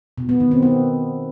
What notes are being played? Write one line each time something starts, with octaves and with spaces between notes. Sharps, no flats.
B2
B3
D#3
C4
B3